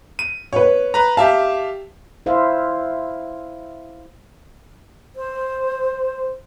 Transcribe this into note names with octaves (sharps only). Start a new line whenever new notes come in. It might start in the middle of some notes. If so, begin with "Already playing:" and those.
D#7
B4 C#5
B4 A#5
G4 E5 F5 A5
E4 C5 E5 F5
C5